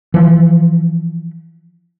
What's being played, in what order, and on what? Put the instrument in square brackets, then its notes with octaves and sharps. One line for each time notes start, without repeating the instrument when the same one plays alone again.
[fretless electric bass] E3 F3